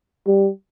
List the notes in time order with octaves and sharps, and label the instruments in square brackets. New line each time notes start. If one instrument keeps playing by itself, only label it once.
[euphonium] G3